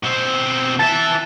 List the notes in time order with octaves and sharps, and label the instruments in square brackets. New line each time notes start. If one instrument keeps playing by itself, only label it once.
[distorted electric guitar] B2 C4
[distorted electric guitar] E3 E5 [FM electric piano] A5 A6